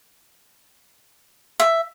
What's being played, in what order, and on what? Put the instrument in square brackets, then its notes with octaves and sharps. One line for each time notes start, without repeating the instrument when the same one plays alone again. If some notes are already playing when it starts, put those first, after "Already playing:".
[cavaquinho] E5